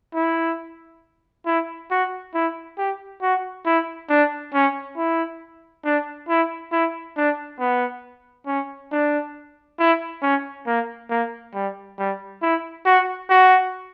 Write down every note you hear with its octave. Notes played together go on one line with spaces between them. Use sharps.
E4
E4
F#4
E4
G4
F#4
E4
D4
C#4
E4
D4
E4
E4
D4
B3
C#4
D4
E4
C#4
A#3
A#3
G3
G3
E4
F#4
F#4